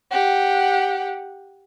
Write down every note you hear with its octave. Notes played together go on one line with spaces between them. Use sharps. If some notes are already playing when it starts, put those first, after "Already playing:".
G4 F#5